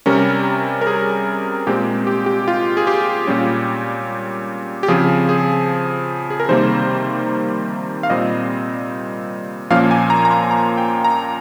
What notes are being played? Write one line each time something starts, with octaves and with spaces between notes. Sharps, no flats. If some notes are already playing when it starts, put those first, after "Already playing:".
C3 G3 C#4 A#4
A#4
G#4
A#2 G#3 C4 G4
G4
G4
F4
G#4
G4
A#2 G3 C#4
G4
C#3 F3 C4 G#4
G#4
G#4
A#4
C3 D#3 G3 A#3 C5
F5
A#2 G3 C4 D#5
A#2 F3 A#3 C#4 F5
G#5
A#5
A#5
C6
A#5
G5
A#5